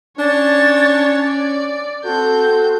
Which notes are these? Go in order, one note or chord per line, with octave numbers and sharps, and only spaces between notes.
C#4 D4 C#5 A6
D5
C4 F#4 A4 G6